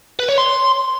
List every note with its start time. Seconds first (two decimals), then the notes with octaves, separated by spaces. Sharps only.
0.19 B4
0.29 C#5
0.38 C6